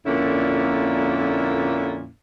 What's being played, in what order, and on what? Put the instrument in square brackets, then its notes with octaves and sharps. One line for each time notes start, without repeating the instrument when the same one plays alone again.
[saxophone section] F2 A#2 D3 A#3 C#4 E4